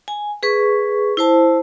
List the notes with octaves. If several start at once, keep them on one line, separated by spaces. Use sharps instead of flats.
G#5
G#4 B4 C#6
E4 C5 A5